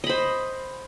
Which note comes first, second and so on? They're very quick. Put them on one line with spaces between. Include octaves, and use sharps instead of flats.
D#5 B5 C5